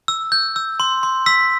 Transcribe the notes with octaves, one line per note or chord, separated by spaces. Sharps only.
E6
G6
E6
C6
C6
E6 B6